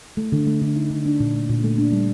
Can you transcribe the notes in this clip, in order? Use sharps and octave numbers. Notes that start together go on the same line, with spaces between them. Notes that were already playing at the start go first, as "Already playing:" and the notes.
A3
D3
A3
D3
D#4
D3
D4
A#2
A3
A#2
A3
D4
G3